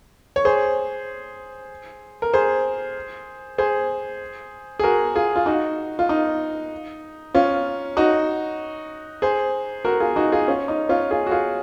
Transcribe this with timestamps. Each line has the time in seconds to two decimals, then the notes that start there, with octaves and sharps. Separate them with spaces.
0.36 C#5
0.45 G#4 C5
2.22 A#4
2.34 G#4 C5
3.58 G#4 C5
4.79 G#4
4.83 F#4 A#4
5.15 F4 G#4
5.36 F4
5.46 D#4 F#4
5.99 F4
6.09 D#4
7.34 C#4 F4
7.97 D#4 F#4
9.22 G#4 C5
9.85 F#4 A#4
10.00 F4 G#4
10.16 D#4 F#4
10.32 F4 G#4
10.48 C#4 F4
10.68 D#4
10.89 C#4 F4
11.11 F4 G#4
11.27 F#4
11.31 F4 G#4